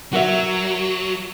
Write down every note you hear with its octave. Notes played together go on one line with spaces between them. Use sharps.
F#3 F#4 A#4 E5